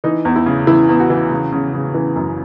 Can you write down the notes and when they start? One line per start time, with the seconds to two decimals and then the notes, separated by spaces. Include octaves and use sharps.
0.04 E3 D#4
0.25 E2
0.36 E4
0.46 C#3
0.67 E3 E4
0.89 E2
1.00 F#4
1.10 E3
1.31 C#3
1.52 C#3
1.73 C#3
1.94 E3
2.16 F#2